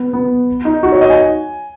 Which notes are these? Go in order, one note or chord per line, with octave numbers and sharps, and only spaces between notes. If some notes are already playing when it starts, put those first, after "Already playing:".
Already playing: B3
B3
D#4
F#4
C#5
D#5
G#5